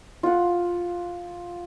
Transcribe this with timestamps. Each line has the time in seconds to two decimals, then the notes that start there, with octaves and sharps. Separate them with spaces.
0.23 F4 F#5